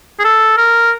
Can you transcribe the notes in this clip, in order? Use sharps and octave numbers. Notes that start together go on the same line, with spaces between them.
G#4
A4
A#4